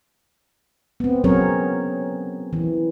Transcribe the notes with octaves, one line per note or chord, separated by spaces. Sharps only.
B3 C4
F#3 C4 C#4 G#4 A#4 C#5
E3